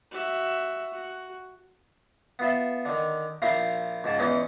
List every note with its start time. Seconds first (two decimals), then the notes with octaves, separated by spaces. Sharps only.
0.11 F#4 E5
0.92 F#4
2.39 B3 F4 E5
2.85 D3 D#3
3.42 A#1 F3 E4 F5 A#5 C6
4.04 C#2 G#2 A5
4.19 E2 E3 C#4 D#4